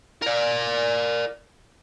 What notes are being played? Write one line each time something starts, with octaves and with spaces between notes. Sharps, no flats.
A#4 D5